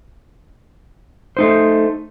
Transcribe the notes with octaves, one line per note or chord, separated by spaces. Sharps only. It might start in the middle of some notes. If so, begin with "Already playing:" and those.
A3 D#4 C5